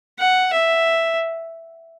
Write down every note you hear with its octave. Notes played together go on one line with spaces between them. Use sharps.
F#5
E5